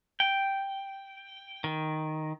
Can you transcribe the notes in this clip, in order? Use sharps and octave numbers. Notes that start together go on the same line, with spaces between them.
G5
D#3